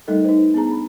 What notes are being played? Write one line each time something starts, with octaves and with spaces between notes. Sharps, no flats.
G3 A3 D#4 A4 A#4 D#5
D#4 B4 C5
B3 D4 G#4 A5 A#5
B5